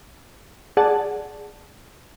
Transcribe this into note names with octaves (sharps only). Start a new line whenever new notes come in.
G#4 D5 F#5 A5